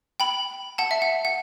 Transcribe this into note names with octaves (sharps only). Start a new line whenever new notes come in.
G5 B5
F#5 A5
E5
F#5
F#5